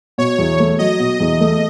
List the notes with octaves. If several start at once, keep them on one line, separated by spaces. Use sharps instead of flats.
B2 C#5
E2
A3
F#3 D#5
B2
E2
A3